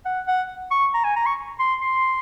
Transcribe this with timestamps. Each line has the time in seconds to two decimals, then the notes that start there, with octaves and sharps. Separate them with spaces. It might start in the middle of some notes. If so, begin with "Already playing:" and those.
0.05 F#5
0.27 F#5
0.71 C#6
0.94 A#5
1.04 G#5
1.16 A#5
1.26 C#6
1.60 C6
1.82 C6